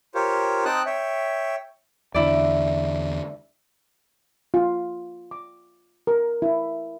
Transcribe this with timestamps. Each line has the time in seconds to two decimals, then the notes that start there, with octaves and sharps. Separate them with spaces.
0.15 F4 G4 A#4 C5 C#5
0.65 C4 D#4 G5 A5 D#6 F#6
0.86 C#5 E5 G5
2.14 E2 D3 E4 D5
4.54 F4
5.31 D6
6.07 A#4
6.42 E4